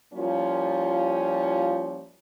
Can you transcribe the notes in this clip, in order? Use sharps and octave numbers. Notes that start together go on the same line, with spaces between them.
F3 G3 A#3 C#4 E4 F4